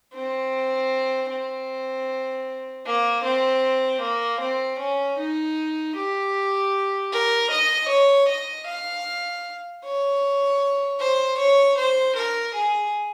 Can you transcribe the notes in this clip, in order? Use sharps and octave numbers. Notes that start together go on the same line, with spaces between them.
C4
C4
A#3
C4
A#3
C4
C#4
D#4
G4
A#4
D#5
C#5
D#5
F5
C#5
C5
C#5
C5
A#4
G#4